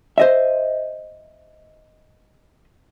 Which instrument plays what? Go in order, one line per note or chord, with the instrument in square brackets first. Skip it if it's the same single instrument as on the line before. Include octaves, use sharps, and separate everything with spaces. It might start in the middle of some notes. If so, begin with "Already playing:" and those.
[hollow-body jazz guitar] C5 D#5 E5